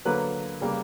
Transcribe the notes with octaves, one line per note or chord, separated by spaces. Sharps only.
D3 F#3 A#3 B4
C#3 G3 A#3